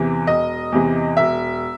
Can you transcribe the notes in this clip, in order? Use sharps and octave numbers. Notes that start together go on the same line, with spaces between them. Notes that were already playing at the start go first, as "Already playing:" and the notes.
Already playing: E2 C3 E3
E1 D#5
E2 C3 E3
E1 E5